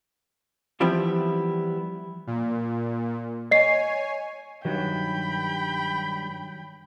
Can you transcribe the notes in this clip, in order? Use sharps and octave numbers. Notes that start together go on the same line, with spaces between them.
E3 F3 G3 B3 C4 E4
A#2
C#5 D#5 G#5 C7
G2 D#3 F#3 F#4 G5 B5